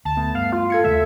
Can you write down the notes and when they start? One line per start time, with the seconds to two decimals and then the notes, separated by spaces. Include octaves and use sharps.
0.05 D2 A5
0.17 A3 B3
0.35 G2 F5
0.52 F4
0.70 A4 G#6 C#7
0.84 D#2 C#3 A3 E5